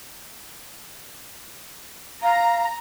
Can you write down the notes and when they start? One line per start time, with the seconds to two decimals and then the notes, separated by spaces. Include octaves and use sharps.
2.23 F5 A#5